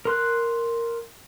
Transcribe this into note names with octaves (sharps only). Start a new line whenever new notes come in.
A#4 C6 F#6